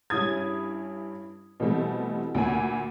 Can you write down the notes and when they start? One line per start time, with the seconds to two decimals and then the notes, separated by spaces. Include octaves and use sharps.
0.10 G2 C#4 E4 D#6 G#6
1.60 B2 E3 G3 A3 C4
2.35 D2 A#2 G#5